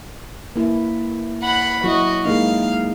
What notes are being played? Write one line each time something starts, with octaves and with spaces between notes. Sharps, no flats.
A#3 E4
F#5 B5
F#3 E4 F#4 D#5
G#3 A#3 D#4 F5